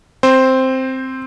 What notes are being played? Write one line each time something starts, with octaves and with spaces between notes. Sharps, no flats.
C4 C5